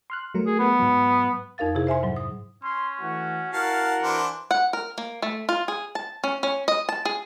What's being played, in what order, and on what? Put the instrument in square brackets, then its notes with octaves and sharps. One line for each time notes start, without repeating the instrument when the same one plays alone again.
[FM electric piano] C6 F6 F#6
F#3 A3 A#4
[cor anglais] G#4
B3
[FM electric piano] G#2 F#3
[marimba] F2 D#4 A#4 F5 A6
C3 E4 G#4
C5 E5 G#5 C6
G#2 F#3
D#6
[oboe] C#4 [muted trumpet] C6
[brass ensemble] E3 A3 F#5 [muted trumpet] F#4
[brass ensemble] E4 F#4 A#4 [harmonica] F5 A5 [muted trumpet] F#5
[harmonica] E3 D4 C5
[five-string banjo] F#5
A#4
A#3
A3
F4
G#4
A5
C#4
C#4
D#5
A5
G#4